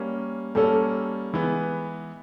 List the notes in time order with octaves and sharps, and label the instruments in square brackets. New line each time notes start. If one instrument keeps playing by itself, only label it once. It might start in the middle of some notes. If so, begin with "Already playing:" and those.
Already playing: [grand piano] G3 A#3 C#4
[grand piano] G3 A#3 C#4 [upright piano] A4
[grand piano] E3 G#3 B3